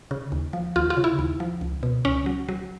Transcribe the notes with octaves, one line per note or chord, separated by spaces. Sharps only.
C#3
D#2
F3
D#2 F4
F4
C#3
E4
D#2
F3
C#2
B2
C#2 C#4
F#3
F#3